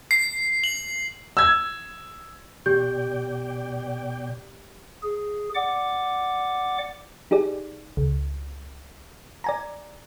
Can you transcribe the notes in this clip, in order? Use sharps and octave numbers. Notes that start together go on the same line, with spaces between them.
C7
F#7
E6 G#6
B2 G4 D5 G5 G6
G#4
D5 F#5 D6
D#4 G4 G#4 D5
C#2
D5 G#5 A#5